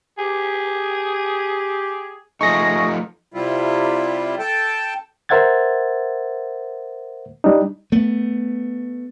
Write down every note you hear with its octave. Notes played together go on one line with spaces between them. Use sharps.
G4 G#4
F3 A3 D#4 G#4 C#6 A#6
C3 G3 E4 F4
A4 G5 A5
A#4 C5 E5 F#5 G#6 A6
G3 D4 D#4
A3 B3